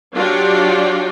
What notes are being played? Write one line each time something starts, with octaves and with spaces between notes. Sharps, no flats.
F#3 D4 F4 G4 C#5 D5